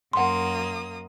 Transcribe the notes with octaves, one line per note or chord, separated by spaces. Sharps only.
F#2 A#3 F#5 C6 D#6